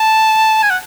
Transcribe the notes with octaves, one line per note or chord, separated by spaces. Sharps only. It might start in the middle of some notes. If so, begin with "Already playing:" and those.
Already playing: A5
G#5
F#5